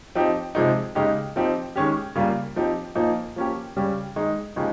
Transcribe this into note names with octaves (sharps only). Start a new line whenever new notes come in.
F3 C4 D#4 G4
C3 F3 G#3 C4 D#4
C#3 G#3 D#4 G4
F3 C4 D#4 G4
D#3 G#3 C#4 G4
C#3 G3 A#3 F4
F3 C4 D#4 G4
A#2 F3 A#3 D#4
F3 A#3 C#4 G4
C#3 G3 C#4 G4
D#3 G#3 D#4
C#3 F3 G#3 D#4 G4